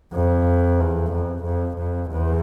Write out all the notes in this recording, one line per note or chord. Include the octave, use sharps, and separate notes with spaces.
F2
E2
F2
F2
F2
E2